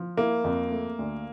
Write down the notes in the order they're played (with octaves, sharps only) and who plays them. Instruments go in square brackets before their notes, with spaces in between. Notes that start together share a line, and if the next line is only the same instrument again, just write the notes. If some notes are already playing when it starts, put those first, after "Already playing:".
Already playing: [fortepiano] F3
[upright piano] A#3 [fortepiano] E4
[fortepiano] F2
A3
D2